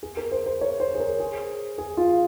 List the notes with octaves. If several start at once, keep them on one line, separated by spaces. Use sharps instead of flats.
G#4
A#4
C5
C5
C#5
C5
G#4
A#4
G#4
G#4
F4